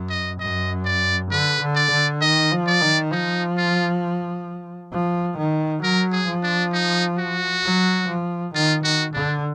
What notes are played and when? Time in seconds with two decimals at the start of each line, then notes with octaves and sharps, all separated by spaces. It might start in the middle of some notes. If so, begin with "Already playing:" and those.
Already playing: F#2
0.10 D#5
0.40 F#2 D#5
0.85 D5
1.31 D3 B4
1.61 D3
1.76 D5
1.91 D3
2.21 D#3 D#5
2.51 F3
2.67 D5
2.81 D#3
3.12 F3 D#4
3.57 F4
4.92 F3
5.38 D#3
5.82 F#3 A#4
6.12 G#4
6.28 F3
6.43 D4
6.73 D#4
7.19 F#4
7.64 F#3
8.08 F3
8.54 D#3 F4
8.84 D#3 F#4
9.14 D3 D4